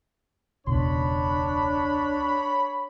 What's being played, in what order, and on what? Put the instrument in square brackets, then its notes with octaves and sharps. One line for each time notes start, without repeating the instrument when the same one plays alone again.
[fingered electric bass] E1 C#2 B2 [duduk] D4 [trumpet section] C#5 B5